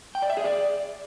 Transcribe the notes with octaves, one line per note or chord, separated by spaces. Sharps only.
G5
D5
E5
G#4
D5